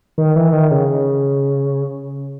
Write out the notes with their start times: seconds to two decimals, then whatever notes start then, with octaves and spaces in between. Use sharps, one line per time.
0.18 D#3
0.36 E3
0.52 D#3
0.71 C#3